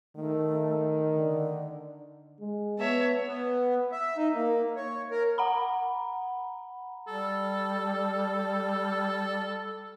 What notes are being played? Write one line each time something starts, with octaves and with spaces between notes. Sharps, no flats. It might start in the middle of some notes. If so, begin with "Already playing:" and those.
D#3 A3
D3
G#3
B3 C#5 E5 A5
B3
E5
D#4
A#3
C#5
A#4
F#5 A#5 B5
G3 A4